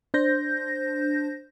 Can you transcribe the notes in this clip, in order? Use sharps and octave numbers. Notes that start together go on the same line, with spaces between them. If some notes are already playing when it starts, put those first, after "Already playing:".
D4 C5 G6 A#6